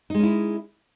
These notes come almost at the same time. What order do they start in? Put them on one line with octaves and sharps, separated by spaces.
D#4 G#3 C#4 E4